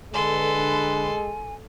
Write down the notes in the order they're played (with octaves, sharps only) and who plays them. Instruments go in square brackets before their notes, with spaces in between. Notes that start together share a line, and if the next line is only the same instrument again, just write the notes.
[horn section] D3 B4 [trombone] G#3 [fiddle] A4 C6 [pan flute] G#5